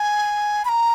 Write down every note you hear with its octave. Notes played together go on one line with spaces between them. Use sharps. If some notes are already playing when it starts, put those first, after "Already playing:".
Already playing: G#5
B5
A#5